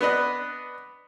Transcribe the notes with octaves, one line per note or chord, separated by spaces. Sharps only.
B3 D4 B4 D#5